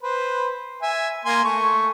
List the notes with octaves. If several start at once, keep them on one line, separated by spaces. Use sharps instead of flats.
B4 C5
E5 G#5
A#3 G#5 C6
A3 C#6